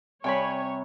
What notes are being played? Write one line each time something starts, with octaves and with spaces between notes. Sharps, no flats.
C3 G3 C#5 G5 G#5 B5